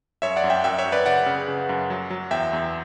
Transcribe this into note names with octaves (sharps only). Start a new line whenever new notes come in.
F#2 C#5 E5
D5 F#5
F#2
E5 G5
F#2 E5 G5
C#5 E5
F#2
B4 D5
C#3 D5 F#5
C#3
C#3
F#2
F#3
F#3
E2 E5 G5
E2